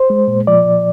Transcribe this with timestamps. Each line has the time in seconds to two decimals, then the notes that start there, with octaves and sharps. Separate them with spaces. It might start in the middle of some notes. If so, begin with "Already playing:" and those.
Already playing: C5
0.10 G#3
0.28 A#2
0.47 F3 D5
0.66 A#2